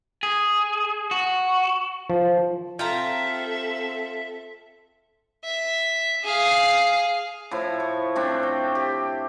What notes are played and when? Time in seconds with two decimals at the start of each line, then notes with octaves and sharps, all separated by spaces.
0.23 G#4
1.11 F#4
2.10 F3
2.79 C4 F4 G4 A4 E5 G5 A#5
5.45 E5
6.24 G#4 F5
7.51 A2 F3 E4
7.80 C#6
8.16 A3 C4 D4
8.43 G5
8.75 G4